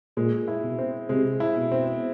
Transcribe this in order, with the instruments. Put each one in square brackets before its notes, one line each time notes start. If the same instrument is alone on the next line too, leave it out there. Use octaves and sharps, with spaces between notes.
[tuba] A#2 [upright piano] G#3
[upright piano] E4
[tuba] B2
[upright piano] C4
[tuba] C3 [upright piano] G#3
[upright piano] E4
[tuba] B2
[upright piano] C4